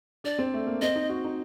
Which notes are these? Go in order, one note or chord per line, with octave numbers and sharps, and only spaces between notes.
D4 D5
C4
A3
A#3
C4 D#5
D#4
F#4
D#4